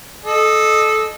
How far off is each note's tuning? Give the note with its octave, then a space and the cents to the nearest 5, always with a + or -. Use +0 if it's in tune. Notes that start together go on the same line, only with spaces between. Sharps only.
A4 -20 D#5 -20